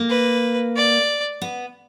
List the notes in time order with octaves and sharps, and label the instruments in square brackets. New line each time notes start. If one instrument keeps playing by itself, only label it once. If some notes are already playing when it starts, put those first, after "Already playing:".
Already playing: [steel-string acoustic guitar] A#3
[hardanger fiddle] B4
D5
[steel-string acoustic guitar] B3